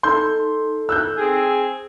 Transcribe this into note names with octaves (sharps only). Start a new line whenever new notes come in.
D#4 A4 C6 G6
E6 F#6 G6
C4 G#4